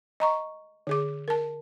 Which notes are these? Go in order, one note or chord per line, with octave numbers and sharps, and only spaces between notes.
D#5 A#5 C#6
D3 G#4 D6
A#4 A5